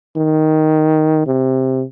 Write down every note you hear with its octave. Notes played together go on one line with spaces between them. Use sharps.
D#3
C3